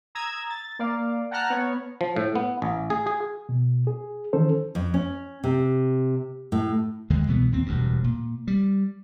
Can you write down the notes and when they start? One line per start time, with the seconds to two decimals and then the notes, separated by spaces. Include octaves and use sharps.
0.15 A#5 D#6 E6 G#6
0.50 A6
0.79 A#3 D5 F5
1.31 F#5 G5 A5 A#5 F6 F#6
1.50 B3 C#5
2.01 F3
2.16 A2
2.36 B3
2.62 A1
2.90 G#4
3.07 G#4
3.49 B2
3.87 G#4
4.33 D#3 E3 C#4 A4 C5
4.75 F2
4.94 C#4
5.44 C3
6.52 A2
7.10 D#2 D3 G#3
7.27 C2 B2 E3 B3
7.52 D#2 A#2 C4
7.66 E1 D2 G2
8.04 A#2
8.47 G3